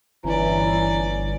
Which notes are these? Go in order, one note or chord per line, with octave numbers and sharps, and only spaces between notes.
G1 E3 C#4 D5 A#5